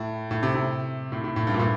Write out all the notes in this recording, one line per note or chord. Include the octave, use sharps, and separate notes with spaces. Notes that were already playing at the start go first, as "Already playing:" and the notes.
Already playing: A2
A2
C3
C3
A2
A2
A2
G2
A#2
A2